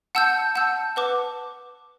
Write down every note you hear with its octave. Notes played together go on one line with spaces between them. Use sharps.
F#5 A5 E6 G6
F#5 A5 E6 G6
B4 F#5 A5 D6